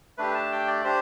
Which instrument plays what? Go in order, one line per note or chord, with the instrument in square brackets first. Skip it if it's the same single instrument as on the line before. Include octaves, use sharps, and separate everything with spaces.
[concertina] A3 D4 G4 B4
A5
G5
D5
D4 G4 C5